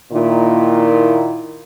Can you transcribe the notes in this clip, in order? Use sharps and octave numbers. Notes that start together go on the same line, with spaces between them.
A#2 D#3 E4